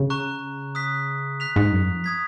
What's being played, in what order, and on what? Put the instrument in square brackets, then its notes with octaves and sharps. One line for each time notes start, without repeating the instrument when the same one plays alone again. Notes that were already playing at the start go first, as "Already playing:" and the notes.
Already playing: [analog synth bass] C#3
[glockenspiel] A#5 C#6 F#6
D#6 F#6 B6
F#6 B6 F7
[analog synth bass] G#2
F#2
F2
[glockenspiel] D#6 G#6 B6